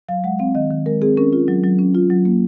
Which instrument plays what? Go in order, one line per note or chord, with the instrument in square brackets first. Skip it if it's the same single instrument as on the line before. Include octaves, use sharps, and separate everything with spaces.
[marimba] F#3 F5
G#3 F#5
C4 F5
D#3 D#5
D#3
G#3 A#4
C4 G#4
C#4 A#4
F4
F#3
F#3
C#4
F4
F#3
A#3